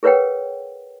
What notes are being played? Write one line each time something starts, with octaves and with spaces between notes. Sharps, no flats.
G#4 A#4 B4 C#5 F#5 G5